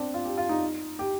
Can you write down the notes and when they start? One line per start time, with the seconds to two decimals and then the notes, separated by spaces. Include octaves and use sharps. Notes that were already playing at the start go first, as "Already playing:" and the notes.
Already playing: C4 D4
0.14 F4
0.25 G4
0.37 F4
0.49 D#4
0.99 G4